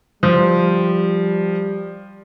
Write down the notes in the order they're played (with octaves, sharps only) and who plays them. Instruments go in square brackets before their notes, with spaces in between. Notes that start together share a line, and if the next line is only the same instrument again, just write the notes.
[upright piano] F3 [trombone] G3